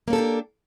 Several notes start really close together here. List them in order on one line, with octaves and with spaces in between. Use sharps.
A#3 C#4 A4 G4 D4